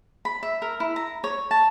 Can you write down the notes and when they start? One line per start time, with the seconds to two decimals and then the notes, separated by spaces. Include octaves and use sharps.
0.25 B5
0.43 E5
0.62 A#4
0.80 E4
0.96 A#5
1.24 C#5
1.51 A5